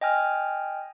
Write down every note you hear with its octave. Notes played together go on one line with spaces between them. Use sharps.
D#5 G5 G#5 F6